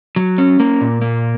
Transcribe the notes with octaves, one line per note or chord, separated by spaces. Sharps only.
F#3
C#4
A#3
A#2
A#3